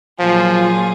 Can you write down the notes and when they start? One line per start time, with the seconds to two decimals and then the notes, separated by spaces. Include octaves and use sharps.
0.19 A#2 F3 F#3 A#3 F4 G#4